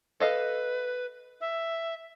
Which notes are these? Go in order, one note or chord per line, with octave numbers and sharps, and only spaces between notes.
A4 B4 D#5 F5
E5